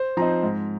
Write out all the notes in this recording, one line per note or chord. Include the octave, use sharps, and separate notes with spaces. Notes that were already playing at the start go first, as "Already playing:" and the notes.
Already playing: C5
F3 C4 D#4 A#5
G#2